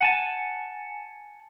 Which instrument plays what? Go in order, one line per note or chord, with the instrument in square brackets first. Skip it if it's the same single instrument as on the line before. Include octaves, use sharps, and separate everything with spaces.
[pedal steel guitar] F#5 G#5 A5